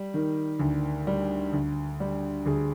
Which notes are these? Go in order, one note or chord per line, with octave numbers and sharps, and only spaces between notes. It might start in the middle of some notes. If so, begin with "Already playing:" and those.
Already playing: G3
D#3
D2
G3
D2
G3
D2 G#4